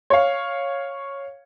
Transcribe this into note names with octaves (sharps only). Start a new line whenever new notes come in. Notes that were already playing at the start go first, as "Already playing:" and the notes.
C#5 F5